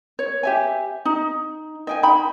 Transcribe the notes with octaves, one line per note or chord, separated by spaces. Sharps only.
C#5
G4 E5 G#5
D#4
D#5 G5 G#5
D#4 G5 B5